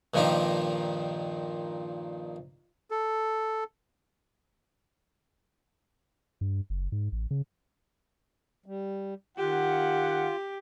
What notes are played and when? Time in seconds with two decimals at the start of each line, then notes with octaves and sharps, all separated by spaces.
0.14 G2 A#2 D#3 F3 D#4 G4
2.90 A4
6.41 G2
6.70 F#1
6.92 G#2
7.12 A1
7.31 C#3
8.66 G3
9.38 D#3 F4 G4 F5 F#5